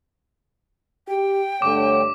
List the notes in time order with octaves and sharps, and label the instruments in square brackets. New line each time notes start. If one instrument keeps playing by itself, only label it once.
[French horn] G4 [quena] G5
[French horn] G2 [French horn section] D3 A3 C#5 [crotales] D6